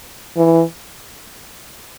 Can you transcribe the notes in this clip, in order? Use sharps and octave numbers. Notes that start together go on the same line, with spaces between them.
E3